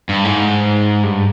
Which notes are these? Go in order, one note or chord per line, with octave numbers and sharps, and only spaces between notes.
G2
G#2
G2